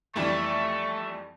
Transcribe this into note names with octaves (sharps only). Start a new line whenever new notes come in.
F2 E3 G3 A3 C#6